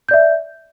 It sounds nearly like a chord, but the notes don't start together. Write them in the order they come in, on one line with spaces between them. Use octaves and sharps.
G6 D5 E5